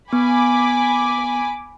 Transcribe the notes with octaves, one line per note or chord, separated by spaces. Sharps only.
B3 G#5 B5 D6